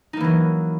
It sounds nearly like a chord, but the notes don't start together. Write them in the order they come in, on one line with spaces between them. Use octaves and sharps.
D#4 A#3 E3 F#3